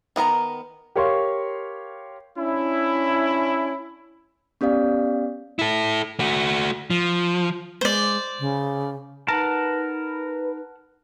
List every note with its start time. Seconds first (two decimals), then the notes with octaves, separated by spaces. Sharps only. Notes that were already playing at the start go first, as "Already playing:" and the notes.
0.16 D#3 B3 A#4 A#5
0.96 G4 A#4 C#5 F5 C6 C#6
2.38 C#4 D4 E4
4.61 B3 C#4 G4 D5 F5
5.59 E4 A4
6.19 A3 F#4
6.90 F3
7.81 G#3 C5 D5
8.40 C#3
9.28 D#4 A#4 B4 F#5 A5